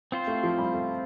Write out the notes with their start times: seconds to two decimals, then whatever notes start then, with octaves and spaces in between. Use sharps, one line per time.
0.12 C4 F4 C5
0.27 A3
0.43 F3
0.58 G3
0.74 A3